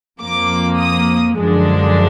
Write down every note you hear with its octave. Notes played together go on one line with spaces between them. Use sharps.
F2 F3 A#3 D6
D#6
F#2 D3 F3 G#3 D4